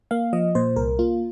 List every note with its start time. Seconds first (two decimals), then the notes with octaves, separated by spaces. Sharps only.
0.11 A#3 F5
0.33 F3 D#5
0.55 A#2 C5
0.76 C2 A#4
0.99 A#3 F4